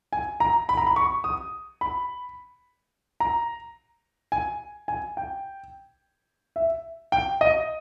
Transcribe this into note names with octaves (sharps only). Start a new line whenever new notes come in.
G#5
A#5
B5
A#5
B5
C#6
D#6
B5
A#5
G#5
G#5
G5
E5
G5
D#5